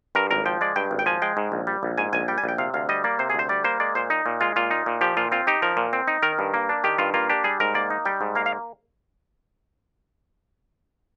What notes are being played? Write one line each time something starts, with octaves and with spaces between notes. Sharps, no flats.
G2 A#4
G#1 A#4
F3 G5
G#3 D5
G2 G5
G#1
G5
F3 G#5
G#3 G5
G#2
A#1
G3
A#1
G#2 G#5
A#1 G#5
G3 G5
G#5
A#1 G5
C3 F5
D2 F5
G3 D#5
A#3 D5
C3 C5
G#4
D2 C5
G3 D5
A#3 C5
G#3 D5
A#2 C5
D#4
A#2
G#3 F4
A#2 F4
D#4
A#2
F3 G4
A#2 F4
C4 F4
D#4 G4
F3 A#4
A#2
C4
D#4
D#3 A#4
G2
A#3
D4
D#3 G4
G2 F4
A#3 F4
D4 G4
G3 G#4
G#2 A#4
A#3 D5
D#4
G3 G5
G#2
A#3 F5
F5